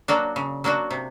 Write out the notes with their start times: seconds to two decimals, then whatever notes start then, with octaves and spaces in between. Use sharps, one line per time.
0.08 F#3 A#3 D4 F#4
0.36 C#3
0.64 F#3 A#3 D4 F#4
0.91 C3